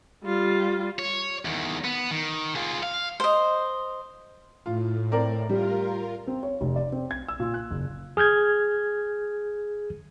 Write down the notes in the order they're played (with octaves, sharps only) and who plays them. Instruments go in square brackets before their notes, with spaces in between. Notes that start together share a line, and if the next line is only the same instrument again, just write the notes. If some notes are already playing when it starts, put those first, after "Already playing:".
[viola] G3 F4
[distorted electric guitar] C#5
E2 D#3
B3
D#3
F4 G#4
F5
[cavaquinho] C5 D#5
[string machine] A2 [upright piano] F4
[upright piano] C4 A#4 D5
[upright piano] G3 [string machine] F4 A#4
[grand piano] C4
C#5
F1
D5
C4
G#6
E6
A#2
F#6
F#1
[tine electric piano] G#4 F6 G6 G#6